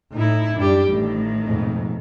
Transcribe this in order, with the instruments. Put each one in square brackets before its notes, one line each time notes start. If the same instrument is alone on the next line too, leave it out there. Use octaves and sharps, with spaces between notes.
[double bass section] A2 [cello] D#4 E4
[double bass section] F#2 G3 [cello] D4 G4
[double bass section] A1 [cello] A2 D#3
[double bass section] F2 G#2 B2